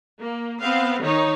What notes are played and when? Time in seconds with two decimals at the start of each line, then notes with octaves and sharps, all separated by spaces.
0.19 A#3
0.60 B3 C4 F5
1.01 D#3 D#4 C#5